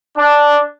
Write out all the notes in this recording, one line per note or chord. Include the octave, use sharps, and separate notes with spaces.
D4